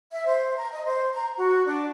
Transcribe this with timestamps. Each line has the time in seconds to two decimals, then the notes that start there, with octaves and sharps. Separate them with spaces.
0.12 E5
0.26 C5
0.57 A#5
0.71 D#5
0.85 C5
1.12 A#5
1.37 F#4
1.66 D4